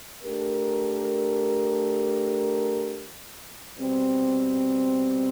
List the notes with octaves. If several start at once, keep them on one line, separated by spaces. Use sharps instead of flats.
A3 D4 G4 A#4
B2 G3 C4